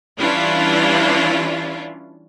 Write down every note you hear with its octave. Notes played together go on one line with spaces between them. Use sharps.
E3 G3 C#4 D4 E4 F4